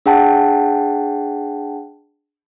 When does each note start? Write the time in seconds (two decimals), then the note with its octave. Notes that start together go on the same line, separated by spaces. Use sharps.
0.06 D4 G#4 F#5 G5 A5